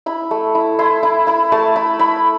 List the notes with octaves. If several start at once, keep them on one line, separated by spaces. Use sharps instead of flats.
E4 B5
A3
E4
E4 C6
E4 B5
E4 B5
A3 A5
E4 B5
E4 B5